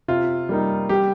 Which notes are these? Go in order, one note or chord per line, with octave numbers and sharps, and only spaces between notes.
C3 F4
G3 A#3 D#4
G3 G4